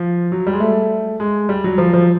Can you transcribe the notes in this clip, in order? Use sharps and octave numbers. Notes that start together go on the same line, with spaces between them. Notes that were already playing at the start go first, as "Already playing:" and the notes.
Already playing: F3
F#3
G3
G#3
A3
G#3
G3
F#3
F3
F3